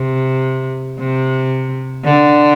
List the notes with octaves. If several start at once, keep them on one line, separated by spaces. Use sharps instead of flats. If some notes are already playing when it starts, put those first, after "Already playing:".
Already playing: C3
C3
D3